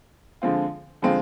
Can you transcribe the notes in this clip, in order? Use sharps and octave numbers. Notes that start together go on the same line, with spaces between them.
D3 F3 G#3 C4 F4
D3 F3 G#3 C4 F4